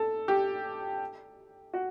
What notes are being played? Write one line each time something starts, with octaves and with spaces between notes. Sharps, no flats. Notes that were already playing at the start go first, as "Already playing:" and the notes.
Already playing: A4
G4
F#4